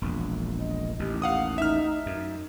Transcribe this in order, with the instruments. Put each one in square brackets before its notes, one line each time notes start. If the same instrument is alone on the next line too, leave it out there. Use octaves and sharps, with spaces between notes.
[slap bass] E1 A#1
[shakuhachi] D#5
[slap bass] A1 D#2 [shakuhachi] G4
[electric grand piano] F5 F#5 D#6
[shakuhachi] D#4 [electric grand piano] E5 F6
[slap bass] F#2 [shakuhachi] D#4